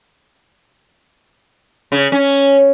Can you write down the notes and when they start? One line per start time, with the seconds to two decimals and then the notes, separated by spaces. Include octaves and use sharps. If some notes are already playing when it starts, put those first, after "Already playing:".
1.92 C#3
2.12 C#4